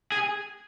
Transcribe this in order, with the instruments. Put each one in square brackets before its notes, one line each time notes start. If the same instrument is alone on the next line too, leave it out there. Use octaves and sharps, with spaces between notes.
[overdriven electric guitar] G#4